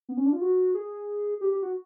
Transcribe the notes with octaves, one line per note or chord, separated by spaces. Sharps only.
B3
C#4
D4
F4
F#4
G#4
G4
G4
F#4